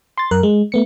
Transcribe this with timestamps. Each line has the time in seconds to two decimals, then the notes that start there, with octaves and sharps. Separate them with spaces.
0.18 C6 A6
0.31 F#2 A#4 F#6
0.43 G#3
0.72 A3 B3 C#7